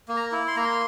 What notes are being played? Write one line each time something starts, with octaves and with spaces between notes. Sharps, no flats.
A#3
A#5
E4
C6
A#3 A#5
C6